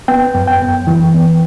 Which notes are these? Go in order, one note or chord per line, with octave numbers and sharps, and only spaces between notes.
B3 G5
F#2
G5
F#2
E3
B3